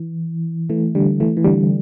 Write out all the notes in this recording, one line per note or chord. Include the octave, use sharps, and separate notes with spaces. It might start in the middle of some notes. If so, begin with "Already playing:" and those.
Already playing: E3
E3 A3
D3 G3
E3 A3
E3
D3 G3